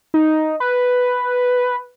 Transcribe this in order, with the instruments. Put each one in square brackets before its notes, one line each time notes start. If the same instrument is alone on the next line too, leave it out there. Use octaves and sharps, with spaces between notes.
[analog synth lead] D#4
B4